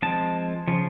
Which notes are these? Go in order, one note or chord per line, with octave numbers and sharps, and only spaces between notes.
F3 G#3 C4 A5
C#3 F3